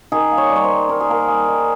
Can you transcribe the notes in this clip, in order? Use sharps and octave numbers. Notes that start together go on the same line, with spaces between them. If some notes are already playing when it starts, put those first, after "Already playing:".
D#3 G#4
A#3
C#5
G3
C#5
C5
D#3
D#3 A#4
G#4
A#3 A#4
G3 G#4
D#3